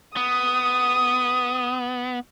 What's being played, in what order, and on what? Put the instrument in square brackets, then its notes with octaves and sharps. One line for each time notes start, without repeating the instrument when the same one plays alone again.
[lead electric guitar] B3 [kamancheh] D#6